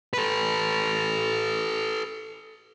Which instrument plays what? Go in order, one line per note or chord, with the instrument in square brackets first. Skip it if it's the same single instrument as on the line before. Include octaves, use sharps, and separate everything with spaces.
[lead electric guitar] A4 B4